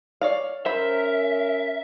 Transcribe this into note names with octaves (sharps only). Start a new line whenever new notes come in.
C#5 D5 F5
C#4 A#4 C5 E5 B5